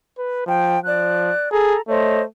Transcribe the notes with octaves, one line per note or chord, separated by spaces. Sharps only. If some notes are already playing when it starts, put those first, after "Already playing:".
B4
F3 G5
F3 D5 F#6
G#4 A4 A#5
A3 C5 C#5 D#5